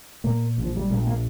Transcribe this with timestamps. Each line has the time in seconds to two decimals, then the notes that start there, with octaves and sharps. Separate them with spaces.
0.24 A#2 A#3
0.58 A#1
0.64 F3
0.77 G3
0.90 A#1 A#3
1.07 A#3